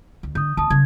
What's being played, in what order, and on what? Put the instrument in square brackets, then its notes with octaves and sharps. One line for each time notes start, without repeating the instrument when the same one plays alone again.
[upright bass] D2
[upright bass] D3 [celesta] D#6 G6
[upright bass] D2 E3 [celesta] A5 D#6
[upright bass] C#3 F#3 [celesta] G#6